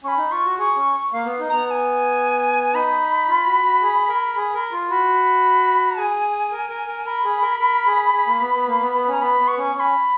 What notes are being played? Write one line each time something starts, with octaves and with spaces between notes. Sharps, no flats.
C#4 B5 C#6
D#4
F4 C#6
F#4
G#4 C#6
C#4
A#3 F5
B3
D#4
B3 A#5
A#5
G#5
D#4 B5
F4
F#4
F#4
G#4
A#4
G#4
A#4
F4
F#4 B5
G#4 G#5
A#4
A#4
A#4
A#4 B5
G#4
A#4
A#4
G#4
G#4
A#3
B3
B3
A#3
B3
B3
C#4
A#5
B3 B5
B3
C#6
C#4
C#4 B5 C#6